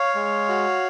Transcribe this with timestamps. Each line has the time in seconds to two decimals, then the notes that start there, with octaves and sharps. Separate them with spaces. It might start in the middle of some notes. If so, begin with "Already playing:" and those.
Already playing: C#5 F5
0.15 G#3
0.49 F#4